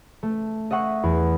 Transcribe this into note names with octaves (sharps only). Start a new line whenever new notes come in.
A3
D#5 E5 F#5 C#6
E2